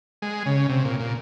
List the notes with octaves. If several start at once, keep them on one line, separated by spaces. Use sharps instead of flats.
G#3
C#3
C3
A#2
A#2